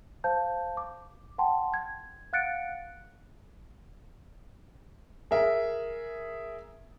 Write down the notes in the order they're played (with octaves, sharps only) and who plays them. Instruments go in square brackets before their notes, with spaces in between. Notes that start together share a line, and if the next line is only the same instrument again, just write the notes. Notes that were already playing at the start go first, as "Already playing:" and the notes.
[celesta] C5 F5 A5 G6
D6
F#5 G5 A5 C6
G#6
F5 F#5 F#6 A6 C#7 D7
[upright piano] G#4 A#4 E5